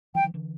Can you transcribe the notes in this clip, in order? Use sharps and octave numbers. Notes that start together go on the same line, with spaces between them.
E3 F#3 G5
D#3 F3
D3 E3